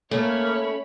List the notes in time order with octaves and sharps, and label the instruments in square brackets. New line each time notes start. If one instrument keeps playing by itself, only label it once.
[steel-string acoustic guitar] A3 C#4 [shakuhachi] A#3 [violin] C#5 B5